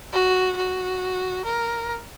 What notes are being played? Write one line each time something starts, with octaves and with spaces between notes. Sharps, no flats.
F#4
F#4
A#4